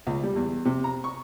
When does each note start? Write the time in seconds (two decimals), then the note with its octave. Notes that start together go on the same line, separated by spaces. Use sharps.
0.07 C#2
0.23 G3
0.36 E2
0.65 C3
0.84 A#5
1.04 C#6